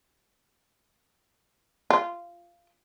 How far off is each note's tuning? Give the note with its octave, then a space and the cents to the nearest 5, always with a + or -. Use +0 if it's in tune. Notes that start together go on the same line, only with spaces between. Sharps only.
F4 -15